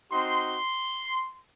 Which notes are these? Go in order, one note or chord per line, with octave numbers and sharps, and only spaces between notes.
C4 D#4 F#4 C6